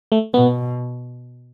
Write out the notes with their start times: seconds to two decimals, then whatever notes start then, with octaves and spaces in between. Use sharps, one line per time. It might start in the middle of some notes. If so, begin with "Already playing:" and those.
0.12 A3
0.34 B2 B3